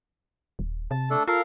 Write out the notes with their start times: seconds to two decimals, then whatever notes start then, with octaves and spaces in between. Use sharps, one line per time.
0.59 D#1
0.91 C3 A5
1.10 A3 D4 A4
1.28 F4 A4 A#4 F5